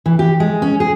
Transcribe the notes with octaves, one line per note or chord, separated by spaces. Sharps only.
E3
G4
G#3
C#4
G#4